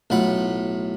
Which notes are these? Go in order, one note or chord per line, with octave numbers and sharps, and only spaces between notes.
B1 A2 F4 F#5 B5